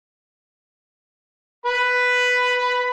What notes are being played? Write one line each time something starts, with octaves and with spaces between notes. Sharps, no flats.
B4 B5